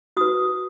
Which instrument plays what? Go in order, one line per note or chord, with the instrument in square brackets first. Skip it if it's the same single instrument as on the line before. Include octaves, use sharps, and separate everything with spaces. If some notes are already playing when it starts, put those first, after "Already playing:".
[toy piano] F#4 B4 D#6